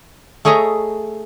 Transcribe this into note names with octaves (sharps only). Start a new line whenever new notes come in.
A3 G#4 C#5 D#5 E5 A#5